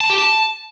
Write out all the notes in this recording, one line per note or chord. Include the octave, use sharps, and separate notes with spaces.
A5
G4
A5